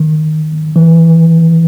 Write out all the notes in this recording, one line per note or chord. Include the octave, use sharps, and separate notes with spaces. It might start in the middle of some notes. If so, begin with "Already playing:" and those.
Already playing: D#3
E3